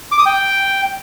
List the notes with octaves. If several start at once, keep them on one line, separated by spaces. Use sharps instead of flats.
D6
D#6
G5